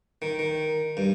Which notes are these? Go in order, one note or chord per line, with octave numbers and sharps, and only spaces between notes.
D#3
D#3
G2